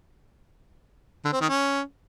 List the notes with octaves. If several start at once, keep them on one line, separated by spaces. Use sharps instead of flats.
D3
C4
D#3
C#4